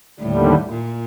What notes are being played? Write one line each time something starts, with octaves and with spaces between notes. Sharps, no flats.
D#2 A2 D3 G3
A#2